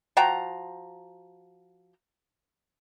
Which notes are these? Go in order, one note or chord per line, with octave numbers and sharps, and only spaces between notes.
F3 F#4 G5 A#5